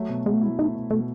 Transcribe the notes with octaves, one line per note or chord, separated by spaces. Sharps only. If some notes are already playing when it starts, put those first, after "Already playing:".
Already playing: F#3 A3
B2
B2 G#3
A3
G#3 E4
A3 D#4
B2
B2 A3